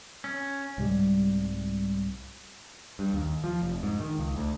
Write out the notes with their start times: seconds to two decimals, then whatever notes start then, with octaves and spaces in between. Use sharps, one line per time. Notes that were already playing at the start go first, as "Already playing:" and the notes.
0.24 C#4
0.78 C2 G#2 G3
2.99 G2
3.13 D#2
3.44 F3
3.62 F1
3.83 G#2
4.00 D#3
4.19 C#2
4.37 D2